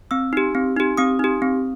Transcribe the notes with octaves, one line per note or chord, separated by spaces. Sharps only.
C4 E6
D#4 G4
C4
D#4 G4
C4 D#6
D#4 G4
C4